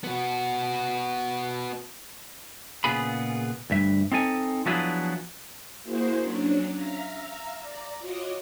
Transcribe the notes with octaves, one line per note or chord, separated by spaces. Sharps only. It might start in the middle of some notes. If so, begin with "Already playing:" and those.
B3 F#4
A#2 C#3 B3 F4 G#4 B5
D2 G2 E5
C4 D#4 A4 G#5
F3 F#3 B3 D4 E4 G#4
A#3 E4 F#4 G#4 C5
F#3 C#4 D4
E5 F5 A#5
D5 A#5
F4 F#4 C#5 D#5 D6